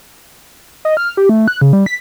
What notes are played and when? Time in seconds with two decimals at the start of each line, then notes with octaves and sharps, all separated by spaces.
0.85 D#5
0.97 F6
1.17 G4
1.29 A3
1.48 F#6
1.61 C#3
1.73 G3
1.86 B6